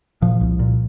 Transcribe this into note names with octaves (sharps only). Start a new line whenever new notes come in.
A#2 F3
C2
A#2